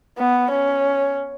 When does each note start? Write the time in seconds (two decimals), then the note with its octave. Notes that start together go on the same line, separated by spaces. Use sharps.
0.18 B3
0.52 C#4